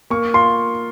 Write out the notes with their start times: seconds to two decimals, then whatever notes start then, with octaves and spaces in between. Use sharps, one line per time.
0.10 A#3 C#6
0.34 F4 C6